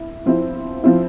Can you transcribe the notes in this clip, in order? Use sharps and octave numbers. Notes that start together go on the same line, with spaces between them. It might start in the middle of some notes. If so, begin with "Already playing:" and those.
Already playing: E4
F3 C4 E4
F3 C4 E4